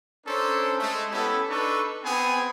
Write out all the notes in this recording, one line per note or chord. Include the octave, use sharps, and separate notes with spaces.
C#4 D4 A4 A#4 C5
G#3 A3
B3 C#4 E4 G4 A4
D4 D#4 A4 B4 C#6
B3 C4 G#4 G#5